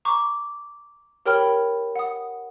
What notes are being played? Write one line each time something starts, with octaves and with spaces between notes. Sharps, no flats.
A#5 C#6 D6
G4 A#4 C#5 G5 B5 F6
F#5 D#6